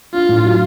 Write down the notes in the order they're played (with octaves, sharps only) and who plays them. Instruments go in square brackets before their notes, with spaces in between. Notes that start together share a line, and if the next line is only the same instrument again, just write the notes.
[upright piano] D4 [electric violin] F4
[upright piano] A2
F#3